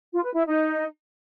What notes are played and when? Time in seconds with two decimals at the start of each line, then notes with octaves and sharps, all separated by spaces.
0.13 F4
0.24 B4
0.34 E4
0.45 D#4